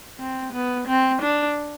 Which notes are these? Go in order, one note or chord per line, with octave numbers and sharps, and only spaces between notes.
C4
B3
C4
D4